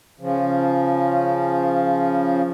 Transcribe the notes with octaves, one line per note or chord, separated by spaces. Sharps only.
C#3 F3